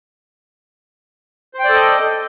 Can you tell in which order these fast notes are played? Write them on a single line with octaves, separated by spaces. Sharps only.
C5 G5 D5 A4 D#5